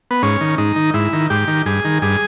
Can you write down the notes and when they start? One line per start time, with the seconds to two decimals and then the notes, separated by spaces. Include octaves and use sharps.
0.11 B3
0.23 G#2 C#4
0.41 D#3
0.58 G#2 D#4
0.76 D#3
0.94 G#2 E4
1.13 D#3
1.30 G#2 G4
1.48 D#3
1.66 G2 G#4
1.84 D#3
2.02 G2 G#4